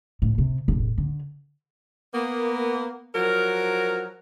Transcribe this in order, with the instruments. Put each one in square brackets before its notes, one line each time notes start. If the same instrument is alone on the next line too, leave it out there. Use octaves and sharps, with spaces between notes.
[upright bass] A2
C3
E1 A1
D3
[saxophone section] A#3 B3
F3 F#3 A#4